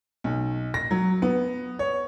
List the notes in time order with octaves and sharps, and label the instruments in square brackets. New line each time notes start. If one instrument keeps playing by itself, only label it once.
[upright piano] B1
A#6
F#3
B3
C#5